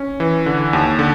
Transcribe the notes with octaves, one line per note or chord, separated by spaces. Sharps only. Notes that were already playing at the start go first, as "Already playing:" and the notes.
Already playing: C#4
E3
D3
D#2
D3